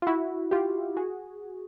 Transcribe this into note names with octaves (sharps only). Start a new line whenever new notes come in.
F4
E4 F#4
F4 G4
F#4 G#4